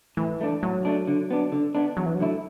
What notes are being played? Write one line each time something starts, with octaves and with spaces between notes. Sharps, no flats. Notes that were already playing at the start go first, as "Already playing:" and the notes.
A2 E3
A3 D4
A2 F#3
A3 D4
D3
B3 D4
D3
B3 D4
E2 F#3
E3
F#3
D3 A3 E4